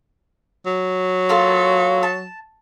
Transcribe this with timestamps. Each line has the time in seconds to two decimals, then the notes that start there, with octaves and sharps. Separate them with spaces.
0.66 F#3
1.29 A#3 F4 A4
2.03 A5